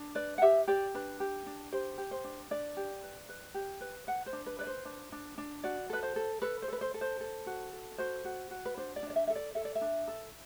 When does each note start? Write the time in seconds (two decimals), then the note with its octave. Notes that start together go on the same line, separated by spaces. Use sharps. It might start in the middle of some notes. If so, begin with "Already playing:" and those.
Already playing: D4
0.15 B4 D5
0.38 F#5
0.42 G4 E5
0.68 G4 D5
0.94 D4 B4
1.20 G4
1.46 D4
1.72 G4 C5
1.98 G4
2.11 C5
2.24 D4
2.51 D4 D5
2.77 G4
3.03 B4
3.29 B4
3.54 G4
3.81 B4
4.07 B4 F#5
4.26 C5
4.33 D4
4.46 B4
4.59 B4 D5
4.67 C5
4.85 D4
5.12 D4
5.38 D4
5.64 F#4 D5
5.90 A4 B4
6.03 C5
6.16 A4
6.42 A4 B4
6.62 C5
6.68 A4 B4
6.81 C5
6.94 A4
7.01 C5
7.21 A4
7.46 F#4
7.73 A4
7.98 F#4 C5
8.25 F#4
8.51 F#4
8.65 B4
8.77 D4 C5
8.96 D5
9.03 D4
9.10 D5
9.16 E5
9.27 A4 E5
9.35 D5
9.55 A4 E5
9.65 D5
9.75 E5
9.81 D4
10.08 A4